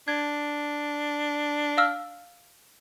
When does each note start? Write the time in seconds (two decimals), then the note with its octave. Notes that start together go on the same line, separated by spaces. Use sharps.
0.08 D4 G#6
1.78 F5 E6 F6